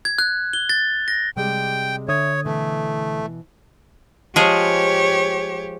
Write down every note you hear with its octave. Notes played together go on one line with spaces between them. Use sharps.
G#6
F#6
G7
A6
A#6
C3 G3 G#3 G5
D3 C#5 E5 D#6 G#6
B2 E3 A3
F3 G#3 G4 G#4 C#5